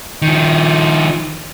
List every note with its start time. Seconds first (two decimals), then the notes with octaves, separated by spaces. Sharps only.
0.22 D#3 F3